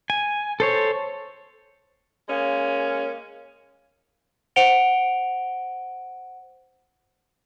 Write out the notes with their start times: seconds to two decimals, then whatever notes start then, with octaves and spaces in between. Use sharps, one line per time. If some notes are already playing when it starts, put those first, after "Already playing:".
0.10 G#5
0.60 A4 C5 C#5
2.28 G#3 A#3 C#4
4.56 C5 F#5 C#7 D7 F7 G7